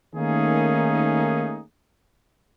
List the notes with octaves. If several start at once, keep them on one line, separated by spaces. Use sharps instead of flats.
D#3 A3 A#3 C#4 D#4 G#4